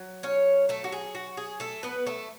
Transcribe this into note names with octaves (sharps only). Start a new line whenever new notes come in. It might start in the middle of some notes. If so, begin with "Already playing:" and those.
Already playing: F#3
C#4 C#5
A3 A4
F#4
G#4
F#4
G#4
A3 A4
B3 B4
A3 A4